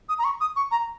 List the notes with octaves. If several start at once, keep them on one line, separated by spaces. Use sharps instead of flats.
D#6
A#5
C#6
D#6
C#6
A#5